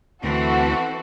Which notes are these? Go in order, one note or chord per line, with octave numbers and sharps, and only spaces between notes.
D2 E3 C4 F#4 A4